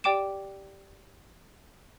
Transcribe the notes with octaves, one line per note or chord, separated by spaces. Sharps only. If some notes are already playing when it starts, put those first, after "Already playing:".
G4 D5 G5 D6 D7 E7